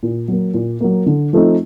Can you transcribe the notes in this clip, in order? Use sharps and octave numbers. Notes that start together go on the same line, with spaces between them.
A#2
F#3 A#3
A#2
F#3 A#3
D3
F3 A3 C4 D#4